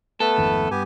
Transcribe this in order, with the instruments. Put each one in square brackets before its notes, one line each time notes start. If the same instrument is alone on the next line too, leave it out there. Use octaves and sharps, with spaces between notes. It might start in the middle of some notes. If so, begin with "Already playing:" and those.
[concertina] A3 B3 B4 [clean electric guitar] A4
[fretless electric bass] G#1 F2 D#3
[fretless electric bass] G2 [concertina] B3 G4 G#5